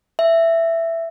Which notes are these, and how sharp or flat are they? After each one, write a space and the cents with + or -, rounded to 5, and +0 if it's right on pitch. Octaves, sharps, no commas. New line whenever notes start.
E5 +10